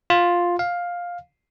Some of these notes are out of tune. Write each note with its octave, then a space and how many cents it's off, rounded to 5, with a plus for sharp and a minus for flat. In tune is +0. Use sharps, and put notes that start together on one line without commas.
F4 +5
F5 +10